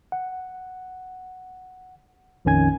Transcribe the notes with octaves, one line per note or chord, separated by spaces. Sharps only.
F#5
A#1 F2 D#3 C#4 G#5 G#6